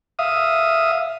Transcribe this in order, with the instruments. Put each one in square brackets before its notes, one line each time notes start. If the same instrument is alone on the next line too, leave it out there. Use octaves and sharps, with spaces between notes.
[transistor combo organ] E5 F5 D#6